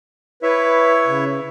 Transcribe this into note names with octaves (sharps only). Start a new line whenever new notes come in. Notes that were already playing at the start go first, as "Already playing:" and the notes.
E4 B4 C#5 E5
C#3